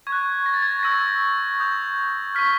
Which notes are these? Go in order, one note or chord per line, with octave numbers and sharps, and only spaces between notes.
C#6 G#6
F#6
A#6
A6
G#6
A6
C#6 E6 G6 A#6
D#6 G6
C#6 F6 B6